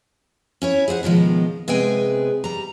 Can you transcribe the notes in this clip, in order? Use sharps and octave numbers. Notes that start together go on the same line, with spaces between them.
C#4 E4 C#5
G#4 C5 D#5 F#5
B2 D#3 F3 G#3
C3 G#3 B3 G#4 G5 G#5
G3 A#5